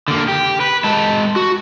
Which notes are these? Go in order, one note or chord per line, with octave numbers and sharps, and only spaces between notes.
D3 A#3
G4
B4
G#3 A5
F#4